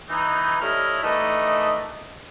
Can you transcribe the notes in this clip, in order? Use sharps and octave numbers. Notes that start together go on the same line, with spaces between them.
E3 D#4
G3 A3 E4 C#5 D#5 F6
D#3 E3 A3 D4 D#4 D#5